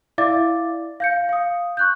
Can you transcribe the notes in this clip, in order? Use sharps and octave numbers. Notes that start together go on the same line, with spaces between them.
E4 D5 E5 F5 D6 A6
F5 G6 C#7
F5 D#6
C#6 F#6 G6